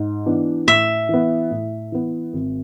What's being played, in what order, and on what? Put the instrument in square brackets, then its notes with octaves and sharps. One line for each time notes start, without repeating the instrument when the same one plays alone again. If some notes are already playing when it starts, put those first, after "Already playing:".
Already playing: [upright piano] G#2
E3 B3 D4
[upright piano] A2 [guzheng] E5
[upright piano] E3 B3
A2
E3 B3
G#1